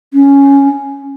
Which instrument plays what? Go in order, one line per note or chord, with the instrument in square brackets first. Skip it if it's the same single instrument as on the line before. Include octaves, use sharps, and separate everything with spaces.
[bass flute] C#4